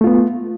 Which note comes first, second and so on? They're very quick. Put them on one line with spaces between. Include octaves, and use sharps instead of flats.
A3 F4 B3